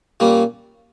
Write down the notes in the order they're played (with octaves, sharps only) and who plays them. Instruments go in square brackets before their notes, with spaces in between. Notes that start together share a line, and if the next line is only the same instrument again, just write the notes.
[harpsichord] A#2 G3 A#3 C#4